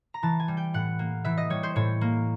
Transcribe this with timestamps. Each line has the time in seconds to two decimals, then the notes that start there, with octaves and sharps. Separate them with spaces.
0.14 A#5
0.23 E3 A5
0.40 G#5
0.48 G3
0.57 G5
0.74 A2 F#5
0.99 A#3
1.25 E3 E5
1.38 D#5
1.50 G3 C#5
1.63 C5
1.76 A2 C#5
2.01 A#3